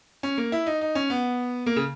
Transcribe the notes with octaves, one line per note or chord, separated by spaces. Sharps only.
C#4
A#3
E4
D#4
D#4
C#4
B3
A#3
C#3